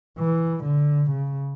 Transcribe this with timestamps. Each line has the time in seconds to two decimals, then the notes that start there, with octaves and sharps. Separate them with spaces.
0.19 E3
0.64 D3
1.11 C#3